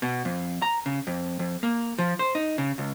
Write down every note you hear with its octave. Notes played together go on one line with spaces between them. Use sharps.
B2
F2
A#5
C#3
F2
F2
A#3
F3
C5
D#4
C#3
C#2